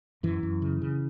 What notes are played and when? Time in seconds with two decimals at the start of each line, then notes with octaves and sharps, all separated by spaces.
0.23 F#2 E3
0.43 F#2
0.62 C#3
0.82 C#3